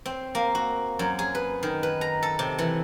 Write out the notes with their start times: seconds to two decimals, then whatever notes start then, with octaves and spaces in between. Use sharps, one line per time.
0.06 C4
0.35 A#3
0.55 F#4
0.99 F#2
1.19 G#4
1.35 B4
1.63 D#3
1.83 B4
2.01 A#5
2.23 A4
2.39 C3
2.58 E3